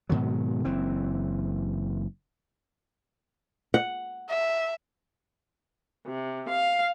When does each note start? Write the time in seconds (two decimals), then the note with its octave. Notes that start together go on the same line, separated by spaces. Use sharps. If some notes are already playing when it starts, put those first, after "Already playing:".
0.09 G#2 B2 D#3 F#3
0.65 F#1 E3 C4
3.74 F#5
4.30 E5
6.06 C3
6.49 F5